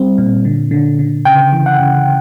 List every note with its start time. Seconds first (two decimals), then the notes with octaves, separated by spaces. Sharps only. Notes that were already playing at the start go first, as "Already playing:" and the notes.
Already playing: G3 C4
0.18 A#2
0.45 D3
0.71 D3
0.99 D3
1.25 C#3 G5
1.53 E3
1.66 F#5
1.80 C#3